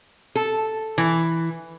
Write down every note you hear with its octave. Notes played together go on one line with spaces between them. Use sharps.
A4
E3